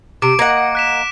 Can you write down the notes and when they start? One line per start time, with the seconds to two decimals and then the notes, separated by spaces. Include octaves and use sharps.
0.22 C3 D6 D7
0.39 A#3 D#5 F#5
0.75 F#6 B6 E7